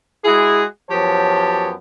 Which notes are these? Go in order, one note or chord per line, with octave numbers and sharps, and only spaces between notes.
G#3 E4 F#4 G#4
F#2 F3 B3 G4 C#5 A5